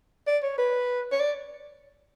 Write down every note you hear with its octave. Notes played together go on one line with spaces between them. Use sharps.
D5
C#5
B4
C#5
D5